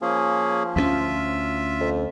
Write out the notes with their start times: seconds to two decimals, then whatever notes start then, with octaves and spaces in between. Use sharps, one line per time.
0.02 F3 A#3 C#4 G#4
0.76 D2 G#3 C#4 F4 E5
1.80 F2